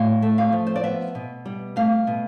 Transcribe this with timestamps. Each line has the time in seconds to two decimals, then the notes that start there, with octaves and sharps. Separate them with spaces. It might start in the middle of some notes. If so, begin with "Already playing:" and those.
Already playing: A2 F5
0.22 A3
0.38 F5
0.53 F3
0.67 C5
0.76 D5
0.84 B3 E5
1.15 B2
1.45 G3
1.76 A3 F5
2.07 B2